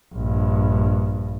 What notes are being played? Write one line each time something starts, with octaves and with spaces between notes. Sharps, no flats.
A#1 G2